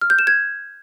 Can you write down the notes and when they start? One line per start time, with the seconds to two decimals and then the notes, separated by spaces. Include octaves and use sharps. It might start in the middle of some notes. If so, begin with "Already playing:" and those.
0.01 F6
0.10 G6
0.19 E7
0.27 G#6